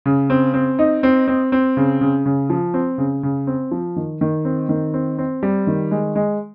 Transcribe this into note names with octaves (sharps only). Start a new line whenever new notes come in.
C#3
C4
C4
D#4
C4
C4
C4
C#3
C#3
C#3
F3
C4
C#3
C#3
C4
F3
D#3
D#3
C4
D#3
C4
C4
G3
D#3
G#3
G#3